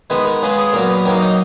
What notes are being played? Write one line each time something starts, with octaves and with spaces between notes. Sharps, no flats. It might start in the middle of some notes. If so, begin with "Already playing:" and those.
D#3 G#3 B3 B4
A#4
C#3 G#3 B3 G#4
G#4
A#2 F#3 B3 A#4
B4
D#3 F#3 A#3 A#4
D#4